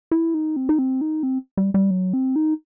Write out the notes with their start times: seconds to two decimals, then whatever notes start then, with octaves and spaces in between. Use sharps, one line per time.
0.11 E4
0.34 D#4
0.56 C4
0.69 D#4
0.79 C4
1.01 D#4
1.23 C4
1.57 G3
1.74 G3
1.91 F#3
2.14 C4
2.36 D#4